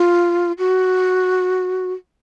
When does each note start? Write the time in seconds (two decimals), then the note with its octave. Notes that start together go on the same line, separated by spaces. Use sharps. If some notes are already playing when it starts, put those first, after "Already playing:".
Already playing: F4
0.58 F#4